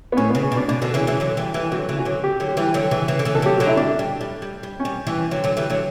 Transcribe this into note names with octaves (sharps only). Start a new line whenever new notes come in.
B3
A2 C#4
B3
C#3
C#4
B2 D4
B2 D4
B2 D3
C#3 E3
C#3 E3
D3 F#3
E3 G3
E3 G3
D3 F#3 F#4
C#3 E3
F#4
D3 F#3
G4
D3 F#3
G4
E3 G3
D3 F#3
C#3 E3
C#3 E3
D3
C#3 E3
A4
D3 F#3 G4
D3 F#3 F#4
E4
G3 D4
G3
G3
G3
G3
C#4
G3
E3 G3
D3 F#3
D3 F#3
E3 G3
D3 F#3